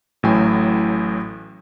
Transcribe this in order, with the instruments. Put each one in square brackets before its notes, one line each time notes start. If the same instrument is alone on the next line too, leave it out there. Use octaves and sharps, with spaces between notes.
[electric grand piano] A1 A2 F#3 G5 G#5